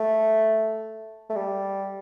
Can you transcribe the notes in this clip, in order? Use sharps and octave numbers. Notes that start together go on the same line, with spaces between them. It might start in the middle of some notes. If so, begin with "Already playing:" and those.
Already playing: A3
A3
G3